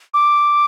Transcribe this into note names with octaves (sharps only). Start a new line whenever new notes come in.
D6